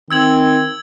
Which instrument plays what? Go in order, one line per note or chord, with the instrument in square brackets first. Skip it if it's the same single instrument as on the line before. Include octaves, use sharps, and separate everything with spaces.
[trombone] D#3 [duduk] C4 [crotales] E6 G#6 F#7